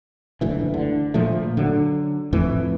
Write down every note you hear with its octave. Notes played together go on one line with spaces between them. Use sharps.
F#1 D2 E3
D3
A#2 F3 A3
D3 F#3
F2 A2 E3